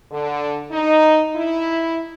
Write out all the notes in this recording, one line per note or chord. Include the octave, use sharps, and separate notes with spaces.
D3
D#4
E4